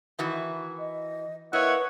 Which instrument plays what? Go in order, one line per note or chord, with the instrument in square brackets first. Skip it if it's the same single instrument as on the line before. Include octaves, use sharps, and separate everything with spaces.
[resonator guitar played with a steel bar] D#3 E3 F#4
[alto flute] D#5
[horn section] A#3 E4 C#5 [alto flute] B4 [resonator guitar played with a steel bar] D#5 [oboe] F#5